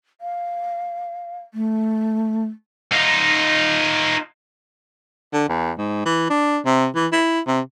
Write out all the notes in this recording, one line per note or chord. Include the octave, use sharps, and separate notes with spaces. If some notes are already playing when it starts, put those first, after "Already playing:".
F5
A3
D#4 F4
D3
E2
G#2
E3
D4
C3
E3
E4
C3